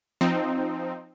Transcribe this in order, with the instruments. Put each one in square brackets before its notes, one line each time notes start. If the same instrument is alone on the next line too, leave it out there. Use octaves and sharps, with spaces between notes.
[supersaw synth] F3 C4 D#4